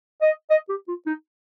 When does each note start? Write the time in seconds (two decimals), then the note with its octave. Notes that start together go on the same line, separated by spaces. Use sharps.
0.21 D#5
0.50 D#5
0.69 G4
0.88 F4
1.06 D#4